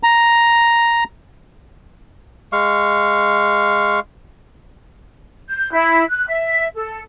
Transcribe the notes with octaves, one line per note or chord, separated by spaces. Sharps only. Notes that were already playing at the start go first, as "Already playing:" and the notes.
A#5
G#3 F5 C#6
G6
E4
F#6
E5
A4